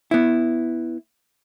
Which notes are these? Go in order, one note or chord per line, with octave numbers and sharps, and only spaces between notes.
B3 E4